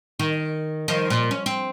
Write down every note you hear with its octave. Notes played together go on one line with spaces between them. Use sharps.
D#3
D#3 F3
A#2
C#4
C4